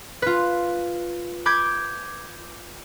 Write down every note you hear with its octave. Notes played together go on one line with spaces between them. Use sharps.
F4 B4
B5 D6 G6 G#6